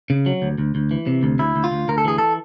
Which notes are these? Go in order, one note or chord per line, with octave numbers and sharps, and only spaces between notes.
C#3
F#3
D2
D2
D2
E3
C3
D2
D2 E4
D2
F4
D2
D2 A#4
A4
E3 G#4
A4